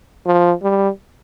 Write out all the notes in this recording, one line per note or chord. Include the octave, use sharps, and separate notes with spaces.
F3
G3